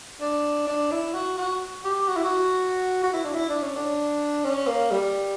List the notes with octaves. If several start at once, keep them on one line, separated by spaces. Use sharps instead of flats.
D4
D4
E4
F#4
F#4
G4
F#4
E4
F#4
F#4
E4
D4
E4
D4
C#4
D4
C#4
A#3
G3